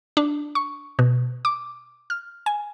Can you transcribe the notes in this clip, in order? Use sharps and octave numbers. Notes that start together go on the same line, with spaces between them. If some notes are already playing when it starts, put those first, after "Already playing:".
D4
C#6
B2
D6
F6
G#5